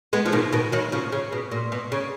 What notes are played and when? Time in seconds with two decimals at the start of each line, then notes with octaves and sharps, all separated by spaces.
0.13 G#3 B3
0.26 F3
0.32 B2 D#3
0.53 B2 D#3
0.72 D#3 F#3
0.92 C#3 F3
1.12 C#3
1.32 B2
1.52 A#2
1.72 B2
1.92 C#3